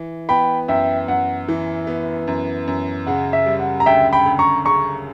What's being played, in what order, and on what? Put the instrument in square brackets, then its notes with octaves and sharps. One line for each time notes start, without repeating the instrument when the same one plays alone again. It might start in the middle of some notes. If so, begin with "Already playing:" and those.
Already playing: [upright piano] E3
[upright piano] B3 [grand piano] G5 B5
[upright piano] F#2 [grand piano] E5 G5
[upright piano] F#2 [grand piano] F#5
[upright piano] E3
B3
F#2
F#2
[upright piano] C#3 [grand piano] F#5
[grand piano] E5
[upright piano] G3
[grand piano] F#5
A#5
[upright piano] D2 [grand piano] E5 G5
[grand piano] G5 B5
[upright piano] D2
[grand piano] A#5 C#6
[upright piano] C#3 [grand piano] A#5 C#6